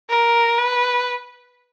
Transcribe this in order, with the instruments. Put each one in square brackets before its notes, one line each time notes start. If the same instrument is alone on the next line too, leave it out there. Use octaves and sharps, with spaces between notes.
[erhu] A#4
B4